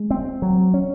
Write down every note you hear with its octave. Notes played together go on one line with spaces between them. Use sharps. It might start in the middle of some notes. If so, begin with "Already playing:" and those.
Already playing: G#3
C4
F#3
C#4